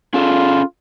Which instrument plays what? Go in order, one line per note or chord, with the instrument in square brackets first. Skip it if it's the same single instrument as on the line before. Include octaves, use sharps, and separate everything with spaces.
[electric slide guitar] C#4 G#4 A4 [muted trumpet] F4